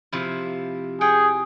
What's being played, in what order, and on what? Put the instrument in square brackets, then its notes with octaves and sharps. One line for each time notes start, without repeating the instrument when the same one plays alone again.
[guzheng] C3 F3 E4
[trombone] G#4 [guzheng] F#5 G5